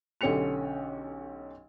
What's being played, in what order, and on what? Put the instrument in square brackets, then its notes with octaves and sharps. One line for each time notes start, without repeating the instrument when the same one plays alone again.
[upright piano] B1 D3 C#4 G4 C#7 F7